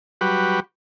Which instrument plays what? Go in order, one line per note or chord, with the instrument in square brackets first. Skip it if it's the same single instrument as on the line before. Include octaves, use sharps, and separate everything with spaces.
[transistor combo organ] F#3 G3 F#4 G4 B4